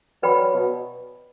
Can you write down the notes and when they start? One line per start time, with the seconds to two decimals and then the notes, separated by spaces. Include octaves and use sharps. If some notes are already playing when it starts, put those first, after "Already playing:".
0.23 F#3 B4 D5 G5 B5
0.55 B2